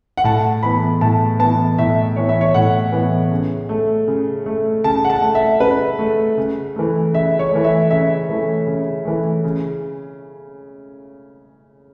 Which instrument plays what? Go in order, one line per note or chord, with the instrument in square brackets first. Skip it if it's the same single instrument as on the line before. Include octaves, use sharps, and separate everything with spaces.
[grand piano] F#5
A2 A5
E3 B3 B5
A2 A5
E3 B3 A5
A2 E5
E3 B3 C#5
E5
C#5
A2 F#5
E3 B3
C#3
A3
C#3
A3
C#3 A5
F#5
A5
A3
E5
C#3 B4
A3
C#3
E3 A3
C#3 E5
C#5
E3 A3
E5
C#3 E5
E3 A3
C#3
E3 A3
C#3